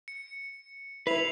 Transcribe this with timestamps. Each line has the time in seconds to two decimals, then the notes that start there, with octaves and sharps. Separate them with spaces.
0.08 C#7
1.07 E4 B4 C7 F7 F#7